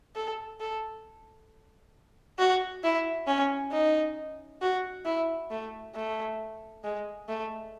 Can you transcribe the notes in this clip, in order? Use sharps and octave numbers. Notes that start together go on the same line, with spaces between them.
A4
A4
F#4
E4
C#4
D#4
F#4
E4
A3
A3
G#3
A3